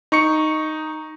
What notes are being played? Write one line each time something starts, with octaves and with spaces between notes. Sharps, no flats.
D#4 C#6 C#7